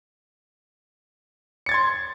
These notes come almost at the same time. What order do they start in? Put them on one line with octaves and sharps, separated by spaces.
C#7 A6 G#6 C6